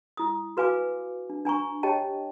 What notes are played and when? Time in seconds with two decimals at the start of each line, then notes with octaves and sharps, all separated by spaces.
0.17 E4 D#6
0.57 F#4 B4 F5 G#5 D6
1.30 D4
1.45 D4 G#5 A#5 C#6
1.83 G4 C#5 D#5 G5 A5